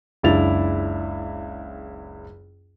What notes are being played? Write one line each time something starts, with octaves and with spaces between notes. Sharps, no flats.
F#1 C#2 D4 E4 A6 F7